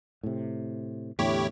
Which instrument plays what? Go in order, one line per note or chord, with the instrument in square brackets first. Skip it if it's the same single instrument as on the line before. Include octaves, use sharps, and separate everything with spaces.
[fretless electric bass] A2 C3
[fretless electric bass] E2 A2 D3 [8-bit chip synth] E4 G4 C#5